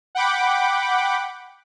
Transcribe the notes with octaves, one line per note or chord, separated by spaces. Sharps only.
F#5 G5 B5 D6